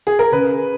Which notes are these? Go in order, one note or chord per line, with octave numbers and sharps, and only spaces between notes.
G#4
A#4
C#3 B4